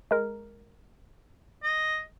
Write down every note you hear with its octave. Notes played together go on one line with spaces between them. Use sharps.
G#3 A#4
D#5